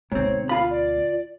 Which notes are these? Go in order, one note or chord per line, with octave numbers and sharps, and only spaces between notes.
D2 G#2 B2 C4 C#5
F4 F5 B5
D5